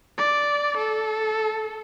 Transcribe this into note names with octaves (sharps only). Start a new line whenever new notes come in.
D5
A4